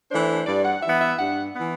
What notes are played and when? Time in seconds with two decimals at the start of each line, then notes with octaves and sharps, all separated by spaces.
0.10 E3 A3 D4 C5
0.46 G2 D5
0.64 F#5
0.82 E3 B3 E5
1.00 E5
1.17 G2 F#5
1.54 E3 B3